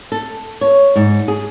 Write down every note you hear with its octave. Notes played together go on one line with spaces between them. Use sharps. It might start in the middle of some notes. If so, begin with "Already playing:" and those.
A4
C#5
G#2
G#4